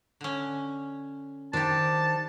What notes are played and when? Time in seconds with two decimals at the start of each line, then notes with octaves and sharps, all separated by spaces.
0.21 D3 C#4
1.53 D#3 D4 G4 C5 A5